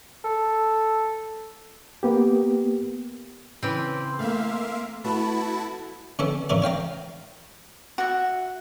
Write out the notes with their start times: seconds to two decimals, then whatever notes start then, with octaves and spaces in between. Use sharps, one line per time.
0.25 A4
2.03 A#3 B3 G4
3.63 C#3 E3 C4 C6
4.19 A3 A#3 E5 F5
5.04 A3 B3 E4 F#4 A5 B5
6.19 D3 B3 C#4 A4
6.49 G#2 C#3 E3 A#4 D5
6.62 C#5 F5 G5 A#5
7.98 F#4 E5